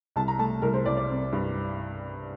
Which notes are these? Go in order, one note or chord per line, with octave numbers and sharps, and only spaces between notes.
C2 A5
A#5
A3 A5
C2 A#4
C5
C2 D5
D5
C4
G2